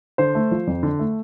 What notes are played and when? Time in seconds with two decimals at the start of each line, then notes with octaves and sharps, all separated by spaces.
0.18 D3 C5
0.35 A3
0.51 F3
0.67 F2
0.83 D3
0.99 A3